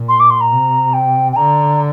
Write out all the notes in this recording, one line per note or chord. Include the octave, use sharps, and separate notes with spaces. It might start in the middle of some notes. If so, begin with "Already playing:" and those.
Already playing: A#2
C6
D6
C6
A#5
C3
G5
G5
D3 A#5